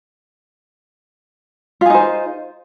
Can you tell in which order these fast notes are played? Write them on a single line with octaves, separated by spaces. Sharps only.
F4 G#4 D#4 C5